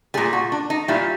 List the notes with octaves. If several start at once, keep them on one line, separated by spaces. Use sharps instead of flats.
A#2 G3 G#4
F#4
D4
D#4
A#2 G3 E4